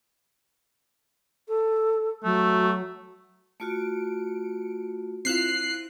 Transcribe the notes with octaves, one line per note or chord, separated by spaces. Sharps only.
A4
F#3 A3
A3 F4 F#4 C#7 D7
C4 E4 F4 F#6 C7